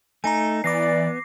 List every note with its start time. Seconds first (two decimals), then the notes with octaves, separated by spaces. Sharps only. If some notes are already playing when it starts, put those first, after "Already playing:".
0.24 A3 D#4 G#5 A#5
0.64 E3 B3 D5 D6 A#6 C7